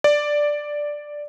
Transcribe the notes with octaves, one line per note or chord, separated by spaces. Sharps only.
D5